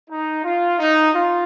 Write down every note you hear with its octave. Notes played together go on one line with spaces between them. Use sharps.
D#4
F4
D#4
F4